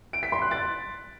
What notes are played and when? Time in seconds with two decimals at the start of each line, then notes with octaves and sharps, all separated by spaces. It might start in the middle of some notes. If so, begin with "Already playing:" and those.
0.13 D7
0.23 B6
0.32 C6
0.42 F#6
0.51 A6